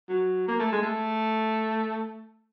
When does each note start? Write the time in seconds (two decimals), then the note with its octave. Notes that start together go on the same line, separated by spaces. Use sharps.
0.09 F#3
0.48 A#3
0.60 A3
0.72 G#3
0.83 A3